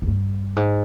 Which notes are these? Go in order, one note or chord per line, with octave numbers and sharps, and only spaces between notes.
E2
G2
G#2